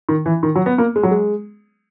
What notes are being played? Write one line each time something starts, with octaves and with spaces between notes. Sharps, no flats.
D#3
E3
D#3
F#3
B3
A#3
G#3
F#3
G#3